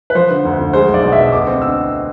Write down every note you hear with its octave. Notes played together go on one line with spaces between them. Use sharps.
B4
F3 C5
D3
D2
D2
G#3 C5
B1
D5
B2
E5
B2
D2 D6
C4
D3 E6